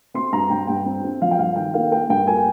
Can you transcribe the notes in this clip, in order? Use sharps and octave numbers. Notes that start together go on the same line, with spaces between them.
C4 C6
G2 A#5
G2 G5
G2 G5
C4
C4
F3 F5
G5
G2 F5
D#3 G5
A#3 F5
A#3 G5
G2 G5
A#3 G#5